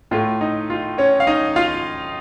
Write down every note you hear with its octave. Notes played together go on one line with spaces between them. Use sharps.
A2 A3 F4
D#4
F4
C#4 C#5
F5
D#4 D#5
F4 F5